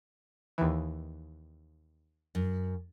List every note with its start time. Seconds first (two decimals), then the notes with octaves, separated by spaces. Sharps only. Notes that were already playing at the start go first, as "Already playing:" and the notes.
0.58 D#2 E3
2.35 F#2